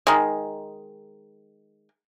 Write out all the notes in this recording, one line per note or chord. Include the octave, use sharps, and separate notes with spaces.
D#3 G#3